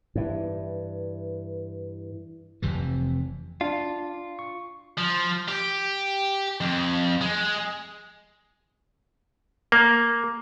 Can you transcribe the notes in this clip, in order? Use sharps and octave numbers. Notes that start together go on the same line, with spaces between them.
G2 E3
F1 F2 C3 E3
D4 F4
C#6
F3
G4
F2
G#3
A#3